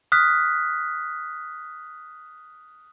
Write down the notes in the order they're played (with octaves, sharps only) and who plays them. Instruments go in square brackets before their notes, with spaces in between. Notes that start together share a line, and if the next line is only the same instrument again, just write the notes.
[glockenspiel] D#6 F6 F#6 B6